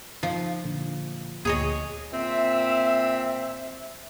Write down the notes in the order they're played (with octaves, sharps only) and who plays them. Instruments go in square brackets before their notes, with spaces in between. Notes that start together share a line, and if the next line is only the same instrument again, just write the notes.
[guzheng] F3 [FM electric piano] D#4
[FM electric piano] A#2 D3
[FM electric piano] D2 A#2 G#6 [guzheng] G#4 C#5 D#5
[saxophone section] A#2 C4 [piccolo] E5